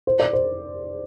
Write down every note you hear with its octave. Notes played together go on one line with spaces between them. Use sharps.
C5
D5
C5